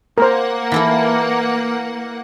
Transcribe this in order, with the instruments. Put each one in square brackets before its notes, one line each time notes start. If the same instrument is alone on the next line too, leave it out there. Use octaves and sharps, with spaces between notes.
[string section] A#3 F#5 [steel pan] A#4 C5
[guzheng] E3 E4 A4